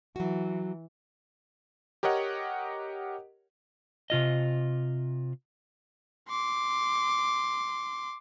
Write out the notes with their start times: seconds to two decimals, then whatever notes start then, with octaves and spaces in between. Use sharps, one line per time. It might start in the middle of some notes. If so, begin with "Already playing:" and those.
0.16 E3 F#3 F#4
2.03 G4 A#4 C#5 D#5 F#5
4.10 C3 F4 D#5
6.29 C6 D6